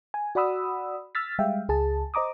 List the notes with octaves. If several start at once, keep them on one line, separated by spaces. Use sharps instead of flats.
G#5
F#4 D5 F#5 B5 D#6 E6
E6 F6 A6 B6
G3 G#3 E5 F5 G5
C#2 G#4 A5
C5 D#5 A#5 D6 D#6